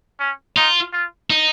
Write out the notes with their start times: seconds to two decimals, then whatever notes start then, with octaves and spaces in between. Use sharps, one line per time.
0.20 C#4
0.57 D#4 F4
0.93 F4
1.30 D#4